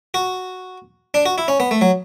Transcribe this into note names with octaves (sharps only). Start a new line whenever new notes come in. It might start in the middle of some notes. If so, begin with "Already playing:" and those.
F#4
D4
F#4
E4
C#4
B3
A3
F#3